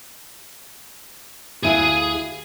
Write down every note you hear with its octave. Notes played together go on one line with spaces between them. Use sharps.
D2 E4 F4 G#4 G#5